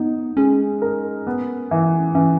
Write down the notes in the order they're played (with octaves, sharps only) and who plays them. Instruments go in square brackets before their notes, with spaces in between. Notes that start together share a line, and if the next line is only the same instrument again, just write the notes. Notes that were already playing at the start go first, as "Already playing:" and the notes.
Already playing: [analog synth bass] B3 [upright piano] D#4
[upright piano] G#3 [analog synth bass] C#4
[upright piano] A#4
B3
E3
[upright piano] E3 [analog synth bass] C#4